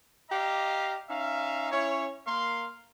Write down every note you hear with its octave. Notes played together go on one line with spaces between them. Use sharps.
G4 D5 D#5 F5 A#5
C#4 D#4 E5 F5
C#4 E4 C#5
A#3 A#4 F5 C6